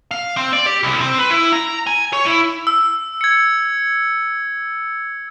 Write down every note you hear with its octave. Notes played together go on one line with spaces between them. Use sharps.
F5
C4
D5
G4
C2
C4
B4
E4
A#5
G#5
C#5
E4
E6
G#6 C#7